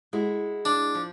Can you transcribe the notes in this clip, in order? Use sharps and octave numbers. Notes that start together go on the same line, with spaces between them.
G#3 E4 F#4
D4
F3